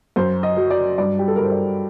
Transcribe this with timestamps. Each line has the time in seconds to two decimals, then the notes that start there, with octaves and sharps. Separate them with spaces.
0.16 F#2 C5
0.43 D#5
0.57 F#3
0.71 D5
0.98 G2 D5
1.19 G4
1.28 A4
1.36 G2 A#4
1.44 C5
1.52 D5